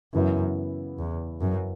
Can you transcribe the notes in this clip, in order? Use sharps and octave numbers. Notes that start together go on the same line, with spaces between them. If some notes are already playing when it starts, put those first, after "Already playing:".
F#2 C#3 E3 B3 E4
E2
F#2